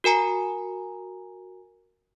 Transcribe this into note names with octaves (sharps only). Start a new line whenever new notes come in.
F#4 A#4 G#5 A#5